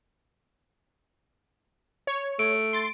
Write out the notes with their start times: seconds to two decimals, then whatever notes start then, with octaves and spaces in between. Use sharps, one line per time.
2.07 C#5
2.39 A3 D7
2.73 C6 A6